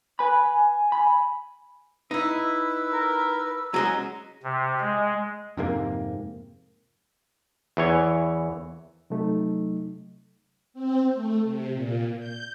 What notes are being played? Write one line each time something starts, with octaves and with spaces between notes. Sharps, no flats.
B4 G#5 B5
B5
D#4 E4 B4 E6
A#4
F#3 G#3 C#4 A#5
C3
G#3
F2 G#2 C3 A#3
E2 E3 C#5
C3 F#3 A3 D#4
C4
A3
C3
A#2
G6